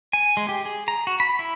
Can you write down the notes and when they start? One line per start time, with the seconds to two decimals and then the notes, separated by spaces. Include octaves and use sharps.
0.13 G#5
0.37 G#3
0.49 G4
0.65 G#4
0.88 A#5
1.07 F#4
1.20 B5
1.39 E4